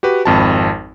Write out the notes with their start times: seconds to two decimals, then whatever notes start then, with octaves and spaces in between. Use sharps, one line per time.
0.03 F#4 G4 B4
0.25 G#1 F2 A5